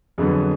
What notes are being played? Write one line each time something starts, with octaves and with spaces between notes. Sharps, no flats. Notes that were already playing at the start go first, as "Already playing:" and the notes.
F2 D3 F#3 B3 G#4